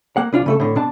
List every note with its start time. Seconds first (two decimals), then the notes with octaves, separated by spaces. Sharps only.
0.17 A#3 F#5
0.33 C2 D4 F4
0.46 C#3 A3 A4
0.60 A2 D3
0.75 B2 D4 A5